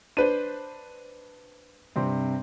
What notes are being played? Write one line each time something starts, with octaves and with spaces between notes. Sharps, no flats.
D4 B4 C5 D#7
G2 C3 C4